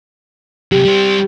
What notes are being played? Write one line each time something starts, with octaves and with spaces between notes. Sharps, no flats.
C3 F#3 G4
G3 C5